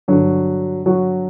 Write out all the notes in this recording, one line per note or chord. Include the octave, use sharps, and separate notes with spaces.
G2 D3 F#3 F#4
F#3 F#4